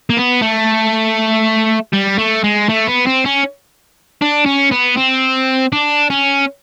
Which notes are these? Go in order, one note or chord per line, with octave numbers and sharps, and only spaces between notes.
A#3
B3
A3
G3
A3
G#3
A3
B3
C4
C#4
D4
C#4
B3
C4
D4
C#4